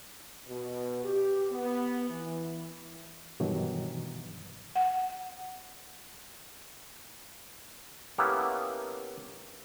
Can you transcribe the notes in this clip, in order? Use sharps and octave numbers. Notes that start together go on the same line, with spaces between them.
B2
G4
B3
E3
G2 B2 D#3 E3 F#3
F#5
A#3 B3 C#4 E4 G4 A4